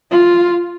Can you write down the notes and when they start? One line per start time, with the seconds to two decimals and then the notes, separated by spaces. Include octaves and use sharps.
0.11 F4